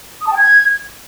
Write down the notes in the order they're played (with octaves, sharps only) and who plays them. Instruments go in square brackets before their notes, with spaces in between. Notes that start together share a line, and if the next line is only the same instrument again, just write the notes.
[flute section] D#6
A5
G5
G#6